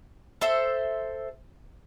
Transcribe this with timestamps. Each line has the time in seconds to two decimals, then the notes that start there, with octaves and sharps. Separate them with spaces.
0.41 A4 C5 E5